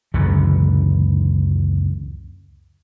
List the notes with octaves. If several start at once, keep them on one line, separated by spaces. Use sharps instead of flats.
C#2 F#2 D3 E3